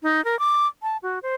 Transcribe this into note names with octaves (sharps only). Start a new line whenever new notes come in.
D#4
A#4
D6
A5
F#4
C5